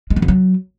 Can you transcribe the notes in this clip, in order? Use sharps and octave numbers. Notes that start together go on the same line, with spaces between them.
G#3
D#3
F2
F#3